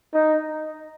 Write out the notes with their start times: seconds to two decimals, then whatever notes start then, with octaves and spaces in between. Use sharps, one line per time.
0.14 D#4